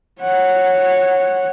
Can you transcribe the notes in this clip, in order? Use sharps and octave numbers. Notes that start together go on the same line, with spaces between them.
C#5 F#5